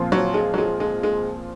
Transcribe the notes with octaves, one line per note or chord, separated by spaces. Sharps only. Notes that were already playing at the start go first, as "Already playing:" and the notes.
Already playing: A#2 F3 C4 F4
F#3
G#3
F#3
G#3
G#3
G#3